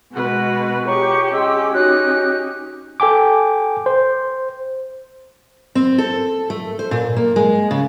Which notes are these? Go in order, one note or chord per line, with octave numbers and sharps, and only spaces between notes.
B2 G#3 F#4 B4
F4 G4 G#4 C#5 A#5 C#6
C#4 D#5 G5 C6 E6
D#4 F#4 G4 C#5 F#6
A4 G5 G#5 D6
C5
C4
A4
A3
C5
A#2
A#3
G#3
C#3